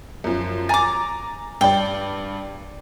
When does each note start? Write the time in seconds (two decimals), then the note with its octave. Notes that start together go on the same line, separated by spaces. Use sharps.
0.24 F#2 F3
0.69 G#5 A#5 D6 A6
1.61 G2 D5 G5